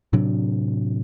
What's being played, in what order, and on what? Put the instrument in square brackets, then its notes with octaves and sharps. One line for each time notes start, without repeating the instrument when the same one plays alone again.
[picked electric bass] A2 C3 F#3 D4